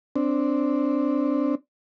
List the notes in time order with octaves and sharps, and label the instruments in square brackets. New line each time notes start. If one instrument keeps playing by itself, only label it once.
[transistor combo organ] C4 D4